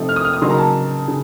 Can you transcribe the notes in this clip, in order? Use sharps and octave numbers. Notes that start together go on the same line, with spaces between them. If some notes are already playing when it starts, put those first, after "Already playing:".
Already playing: C3 F3 A3 D#4
F6
D#6
F6
D#6
C#3 F#3 A#3 D#4 C6
A#5
A5
C#3